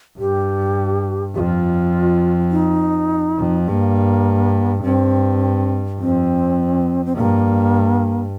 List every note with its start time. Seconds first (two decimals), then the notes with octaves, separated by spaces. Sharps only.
0.19 G2 G4
1.35 F2 F4 G4
2.51 D#4
3.39 F2
3.67 G2 A#3
4.84 G2 C4
6.00 F2 C4
7.06 C4
7.16 G2 A#3